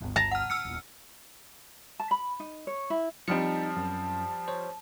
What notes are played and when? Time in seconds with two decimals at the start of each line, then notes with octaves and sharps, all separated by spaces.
0.01 G1 D2
0.16 A5 A#5
0.31 F#5 F6
0.50 C#2 E6 F6 C#7
0.65 D#1 F4
2.00 A5
2.11 B5
2.40 D#4
2.67 C#5
2.90 E4
3.28 F3 G3 C4 D#4 A5 C#7
3.77 F#2
4.48 C5 C#5